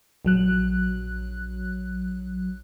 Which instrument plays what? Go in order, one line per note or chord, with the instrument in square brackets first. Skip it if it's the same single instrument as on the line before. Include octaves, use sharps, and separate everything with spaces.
[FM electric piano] A#1 F#3 F#6